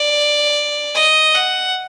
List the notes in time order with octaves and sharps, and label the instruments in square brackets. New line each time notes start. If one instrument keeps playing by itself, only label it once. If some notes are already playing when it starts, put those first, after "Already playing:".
Already playing: [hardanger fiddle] D5
D#5
F#5